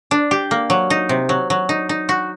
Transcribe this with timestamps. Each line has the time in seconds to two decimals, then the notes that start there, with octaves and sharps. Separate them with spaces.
0.11 D4
0.31 G4
0.51 A#3
0.70 F#3
0.90 D#4
1.09 C3
1.29 F#3
1.50 F#3
1.69 D#4
1.89 D#4
2.09 F#4